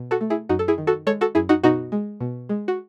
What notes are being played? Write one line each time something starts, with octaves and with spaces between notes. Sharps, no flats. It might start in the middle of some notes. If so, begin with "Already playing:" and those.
Already playing: B2
F#4 A4
A3
E4 G#4
F#2 D#4 F#4
A4
E4 G#4
D#3
F#4 A4
G#3 A4 C#5
F#4 A4
F#2 E4 G#4
D#4 F#4
B2 D#4 F#4
G#3
B2
G#3
F#4